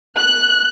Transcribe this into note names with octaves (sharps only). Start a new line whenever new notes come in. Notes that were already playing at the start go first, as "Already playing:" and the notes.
F#6